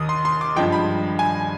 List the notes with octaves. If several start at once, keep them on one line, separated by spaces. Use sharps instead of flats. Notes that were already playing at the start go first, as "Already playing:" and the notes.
Already playing: D#2 D#3 D#6
C6
C6
D6
G2 F3 G#3 G5
B5
G#5